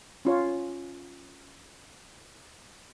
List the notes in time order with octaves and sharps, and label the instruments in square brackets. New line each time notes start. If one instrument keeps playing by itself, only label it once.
[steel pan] C#4 F4 C#5